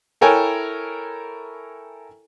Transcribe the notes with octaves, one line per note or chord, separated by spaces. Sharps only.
E4 A4 A#4 C#5 G5 G#5